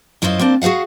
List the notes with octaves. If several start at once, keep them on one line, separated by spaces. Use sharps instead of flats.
F#2 E4 F4 C5 D#5 F5
A#3 C4 D4 C5 D5
F#4 G#4 C5 F5 F#5